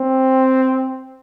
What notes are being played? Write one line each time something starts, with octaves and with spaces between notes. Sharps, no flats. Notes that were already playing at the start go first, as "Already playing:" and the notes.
Already playing: C4